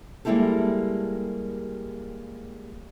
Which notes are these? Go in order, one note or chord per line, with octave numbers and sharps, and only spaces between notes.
G3 G#3 A#3 E4 G4 A4